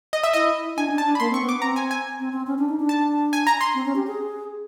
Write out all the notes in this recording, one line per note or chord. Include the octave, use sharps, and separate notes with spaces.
D#5
E5
E4 D#5
D4 G#5
C#4
D4
A5
D4
B5
A#3 C6
C4 C#6
B3
D6
C4 A#5
G#5
G#5
C4
C4
C#4
D4
D#4
D4
A5
G#5
A#5
C6
C4
C#4
G4
G#4